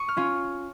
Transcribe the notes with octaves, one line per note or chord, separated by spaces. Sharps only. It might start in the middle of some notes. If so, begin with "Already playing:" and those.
Already playing: C#6 D#6
F6
C#4 F4